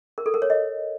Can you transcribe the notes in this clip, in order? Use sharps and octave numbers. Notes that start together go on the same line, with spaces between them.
A#4
A4
A#4
C#5
D#5